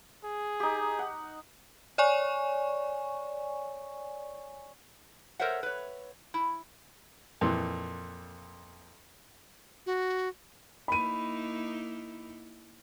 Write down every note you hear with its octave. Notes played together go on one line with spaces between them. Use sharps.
G#4
D#4 G4
F#5
C#5 D5 G#5 C#6
A4 A#4 C5 C#5 E5 F#5
B4 C#5
E4
F2 A#2 E3
F#4
A#3 D#4 E4 B5 D#7